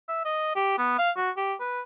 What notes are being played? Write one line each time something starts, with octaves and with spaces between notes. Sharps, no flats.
E5
D#5
G4
B3
F5
F#4
G4
B4